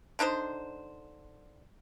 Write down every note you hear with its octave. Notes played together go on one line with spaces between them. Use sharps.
D3 D4 D#4 C5